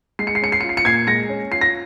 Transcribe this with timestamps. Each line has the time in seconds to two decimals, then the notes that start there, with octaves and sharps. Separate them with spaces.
0.19 G#3 C7
0.27 C#7
0.35 C7
0.42 C#4 C#7
0.52 C7
0.61 F4 C#7
0.69 C7
0.77 C#7
0.85 A#2 G#6 C7
1.07 G#3 A#6 C#7
1.29 C#4
1.52 F4 C7
1.61 A#6